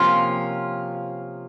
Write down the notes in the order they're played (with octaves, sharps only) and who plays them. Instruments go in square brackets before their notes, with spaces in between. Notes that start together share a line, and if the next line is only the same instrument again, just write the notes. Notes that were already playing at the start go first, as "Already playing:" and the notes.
Already playing: [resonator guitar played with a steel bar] C3 F3 A#3 C#4 F4